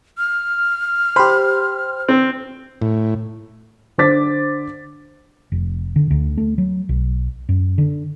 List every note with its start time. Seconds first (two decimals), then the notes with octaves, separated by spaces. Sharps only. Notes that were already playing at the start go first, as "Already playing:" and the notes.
0.18 F6
1.16 G4 C5 B5
2.09 C4
2.82 A2
3.98 D3 C5 D6 A6 B6
5.52 F1
5.96 D3
6.11 D2
6.37 A3
6.58 F#3
6.89 B1
7.49 F#2
7.78 D3